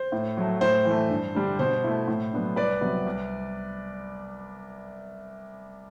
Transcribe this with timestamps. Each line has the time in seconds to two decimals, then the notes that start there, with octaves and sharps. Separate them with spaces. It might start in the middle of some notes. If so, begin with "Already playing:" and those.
Already playing: C5
0.12 A2
0.37 F#3 A3
0.61 A2 C5
0.85 E3
0.91 A3
1.10 G2
1.35 D3 G3 D4
1.59 B2 C5
1.84 A3 E4
2.08 A2
2.33 F#3 B3 D4
2.56 C2 B4 D5
2.81 C3 F#3 B3
3.06 C2